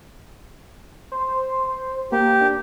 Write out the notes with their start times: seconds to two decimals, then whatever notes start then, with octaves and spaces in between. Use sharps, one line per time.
1.12 C5
2.12 A#3 G4
2.41 D4